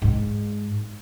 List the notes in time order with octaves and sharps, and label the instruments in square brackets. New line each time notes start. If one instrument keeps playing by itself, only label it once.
[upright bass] G#2 G#3